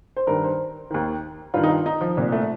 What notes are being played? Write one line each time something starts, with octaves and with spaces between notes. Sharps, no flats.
C5
G2 D#3 A#4
C5
D#2 D#3
G2 D#3 F4
D#4
F4
D#4
F3
C2 A#2
A3